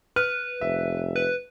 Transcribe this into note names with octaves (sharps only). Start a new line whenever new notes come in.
B4 F6
F1 E5
B4